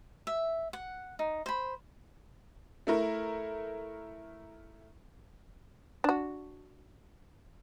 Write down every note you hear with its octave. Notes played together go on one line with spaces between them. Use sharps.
E5
F#5
D#4
C5 B5
A3 E4 A#4
D4 F#4